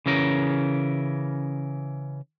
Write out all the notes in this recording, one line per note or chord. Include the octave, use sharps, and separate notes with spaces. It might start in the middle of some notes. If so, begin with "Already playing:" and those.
C#3 E3 C#4 A#4